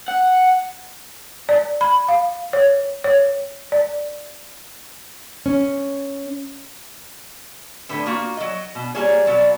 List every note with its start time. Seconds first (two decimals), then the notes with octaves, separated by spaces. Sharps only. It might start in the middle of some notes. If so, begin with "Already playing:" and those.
0.08 F#5
1.49 D5
1.81 B5
2.08 F5
2.53 C#5
3.04 C#5
3.72 D5
5.46 C#4
7.89 A2 D3 B4
8.06 A#3 F4 F#4
8.37 F#3 D#5
8.75 B2
8.95 G3 A#3 G#4 C#5
9.26 B2 F#3 B3 D5